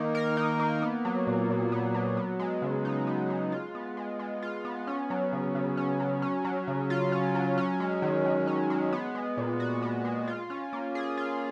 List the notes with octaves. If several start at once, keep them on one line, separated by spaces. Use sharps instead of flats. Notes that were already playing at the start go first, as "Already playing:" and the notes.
Already playing: D#3 A#3 D#4
A#4
D#4
A#3
B3
F#3
A#2
A#2
B3
F#3
B3
G#3
C#3
D#4
B3
G#3
F4
B3
G#3
G#3
F4
B3
C#4
F#3
C#3
C#3
C#4
F#3
C#4
F#3
C#3
F4
C#4
F#3
C#4
G#3
D#3
D#3
C#4
G#3
B3
G#3
A#2
F#4
B3
G#3
F4
C#4
A#3
G#4
F4